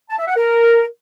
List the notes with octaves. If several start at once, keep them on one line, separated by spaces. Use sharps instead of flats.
A5
E5
F#5
A#4